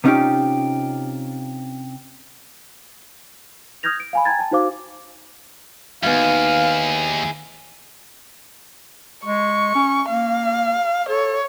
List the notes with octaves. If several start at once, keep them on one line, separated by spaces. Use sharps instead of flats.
C3 B3 C#4 D#4 F4 G4
D#6 F6 G6 G#6 A#6 F7
D7
F5 G#5 B5
G5 G#5 A#5 G#6 A6
G5 A5
D#4 F#4 C5 F5 D6
D#2 B3 D#4 E4 F#4 G#4 F5
G#3 C#6
C#4
A#3 F5
A4 C#5